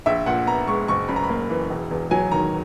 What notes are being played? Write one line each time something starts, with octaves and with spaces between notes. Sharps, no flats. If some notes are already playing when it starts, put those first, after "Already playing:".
A#1 E5
A#2 F#5
B3 A#5
G#3 C#6
F#1 C#6
F#2 B5
A#5
B5
A#3
E3
E1
E2
F#3 G#5
D#3 A#5